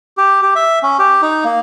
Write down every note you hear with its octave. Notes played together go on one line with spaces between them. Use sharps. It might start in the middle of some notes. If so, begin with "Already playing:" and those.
G4
G4
E5
C#4
G4
D#4
A#3